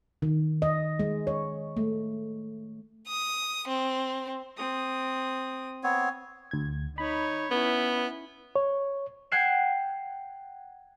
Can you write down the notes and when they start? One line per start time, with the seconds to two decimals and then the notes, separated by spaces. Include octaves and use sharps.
0.22 D#3
0.62 D#5
1.00 G#3
1.27 C#5
1.77 A3
3.08 D#6
3.68 C4
4.57 C4 D#6
5.83 B3 C4 C#5
6.51 D2 G#6
6.98 D#4 C#5 B5
7.51 B3 C#4 E4
8.56 C#5
9.32 F#5 G5 F#6 G#6 C7 E7